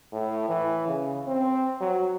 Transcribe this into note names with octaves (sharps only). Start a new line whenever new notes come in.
A2
E3
C#3
C4
F#3